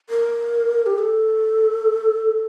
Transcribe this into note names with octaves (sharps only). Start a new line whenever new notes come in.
A#4
G4
A4